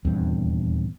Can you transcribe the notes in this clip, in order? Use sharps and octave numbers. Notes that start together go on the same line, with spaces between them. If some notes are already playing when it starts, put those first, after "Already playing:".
D#1 E2 G2 C4